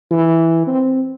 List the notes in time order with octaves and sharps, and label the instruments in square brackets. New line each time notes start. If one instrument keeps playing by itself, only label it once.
[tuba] E3
C4